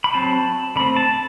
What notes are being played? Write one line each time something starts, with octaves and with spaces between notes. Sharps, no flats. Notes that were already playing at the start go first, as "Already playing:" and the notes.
B5
F#3 C4 A5
D3 A3 C4 B5
A5